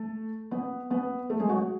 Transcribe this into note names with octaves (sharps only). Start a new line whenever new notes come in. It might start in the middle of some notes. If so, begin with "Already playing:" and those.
Already playing: A3 A4
B3 B4
B3 B4
A3 A4
G#3 G#4
F#3 F#4